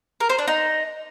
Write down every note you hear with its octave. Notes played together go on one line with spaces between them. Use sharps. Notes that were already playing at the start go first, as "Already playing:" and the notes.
A#4
C5
D4
D#4